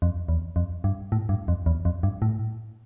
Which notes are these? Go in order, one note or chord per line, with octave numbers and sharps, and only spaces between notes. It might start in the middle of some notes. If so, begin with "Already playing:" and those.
F2
E2
F2
G2
A2
G2
F2
E2
F2
G2
A2